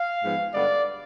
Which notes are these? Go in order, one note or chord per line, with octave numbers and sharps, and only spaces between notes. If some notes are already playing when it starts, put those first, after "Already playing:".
Already playing: F5
G#2 F3 G#3 B3
G2 D3 G#3 B3 D5